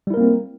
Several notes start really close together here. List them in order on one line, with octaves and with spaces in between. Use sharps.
G3 E4 A#4 A#3 C4